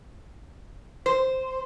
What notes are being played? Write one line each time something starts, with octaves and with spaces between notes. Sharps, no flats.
C5